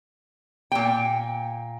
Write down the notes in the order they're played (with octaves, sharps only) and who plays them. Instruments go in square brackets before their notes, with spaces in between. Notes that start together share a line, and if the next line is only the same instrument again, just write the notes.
[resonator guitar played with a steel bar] A#2 G5